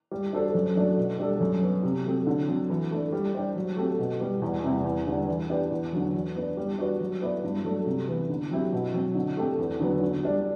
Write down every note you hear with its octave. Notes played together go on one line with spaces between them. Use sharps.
G3
D4 F#4 A4 C5
F#2
F#3 A3 D4
B2
G3 D4 A4
F#2
F#3 B3
C3
F#3 A3 C4
D3
F#3 C4
E3
A3 D4
G3
D4 G4 C5
F#3
A3 C4 G4
B2
G3 B3
E2
C3 G3 C4 E4
E2
D3 G3 D4
E3
B3 D4 G4
E2
D3 F#3
E3
B3 D4
G3
D4 F#4 B4 D5
F#3
B3 E4 B4 D5
G2
F#3 A3 D4
C3
E3 B3
D3
F#3 C4 E4 G4
B2
F#3 C4
D3
A3 C4 G4
E2
D3 F#3 B3
D3
G3 D4